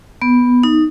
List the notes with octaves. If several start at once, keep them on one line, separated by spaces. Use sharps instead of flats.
B3
D#4